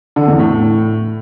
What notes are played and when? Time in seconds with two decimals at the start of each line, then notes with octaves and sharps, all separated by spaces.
0.16 D3
0.28 E2
0.39 A2